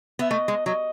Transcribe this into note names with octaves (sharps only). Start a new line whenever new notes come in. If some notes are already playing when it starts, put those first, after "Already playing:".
B3 E5
A3 D#5
G#3
F#3 D#5